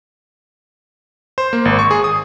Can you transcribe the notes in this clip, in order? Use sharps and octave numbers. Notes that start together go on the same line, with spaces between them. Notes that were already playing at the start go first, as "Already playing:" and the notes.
C5
A#3
G#1
C#6
G#4
D#6